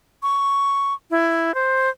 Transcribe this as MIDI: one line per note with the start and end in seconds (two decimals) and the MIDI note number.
0.23 0.94 85
1.11 1.54 64
1.54 1.89 72